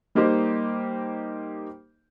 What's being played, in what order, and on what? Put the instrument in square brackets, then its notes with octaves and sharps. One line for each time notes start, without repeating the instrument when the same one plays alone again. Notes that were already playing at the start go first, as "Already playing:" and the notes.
[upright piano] G3 A#3 D#4 G4 C5 D#5